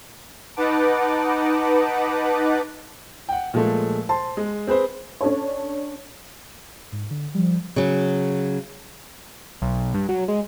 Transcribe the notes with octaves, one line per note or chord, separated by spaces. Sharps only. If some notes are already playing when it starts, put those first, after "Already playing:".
D#4 B4 F#5 A5 D6
F#5 G5
A#2 F3 G#3 A3
C5 A5 C6
G#3
C4 G#4 B4 C5
C#4 D4 A4 C#5
G#2
D3
F3 G3
C#3 F#3
B1
G2
F#3
G#3